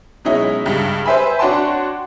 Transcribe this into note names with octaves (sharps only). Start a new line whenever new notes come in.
B2 F#3 G#3 C#4 D#4 E4
C#2 G2
B4 C5 E5 G#5 B5
D4 F#4 C#5 G5 A5 C6